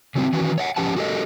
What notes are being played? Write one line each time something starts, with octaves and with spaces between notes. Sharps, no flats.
C#3 F#3 G3 A#3 C4
D#3 E3 C#4 F#4 B4
C#5 E5 F#5
F3 C#4 G4 B4 F#5 A5
F#4 G4 A4 A#4 D#5